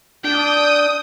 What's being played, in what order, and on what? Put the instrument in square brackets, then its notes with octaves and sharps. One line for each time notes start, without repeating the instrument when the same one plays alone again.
[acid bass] D4 [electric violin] G5 [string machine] D#6